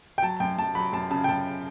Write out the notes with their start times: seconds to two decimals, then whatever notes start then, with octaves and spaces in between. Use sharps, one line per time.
0.18 G5
0.22 F#3 A5
0.40 F#2 G5
0.58 F#2 A5
0.75 F#3 B5
0.93 F#2 A5
1.11 C#3 A5
1.24 G5
1.28 F#2 A5